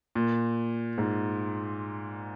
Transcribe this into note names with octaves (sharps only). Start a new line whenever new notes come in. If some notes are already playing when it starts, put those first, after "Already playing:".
A#2
G#2